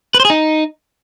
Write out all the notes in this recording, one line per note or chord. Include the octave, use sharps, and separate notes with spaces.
B4
C5
G#4
D#4